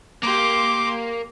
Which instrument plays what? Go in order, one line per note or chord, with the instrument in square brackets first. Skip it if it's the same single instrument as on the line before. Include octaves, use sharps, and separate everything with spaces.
[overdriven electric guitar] A#3 [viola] G4 C6 [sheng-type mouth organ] D6